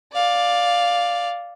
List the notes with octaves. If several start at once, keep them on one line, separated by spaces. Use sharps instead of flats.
D5 F5